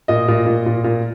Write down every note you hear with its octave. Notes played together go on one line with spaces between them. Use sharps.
A#2 D#5
A#2
A#2
A#2
A#2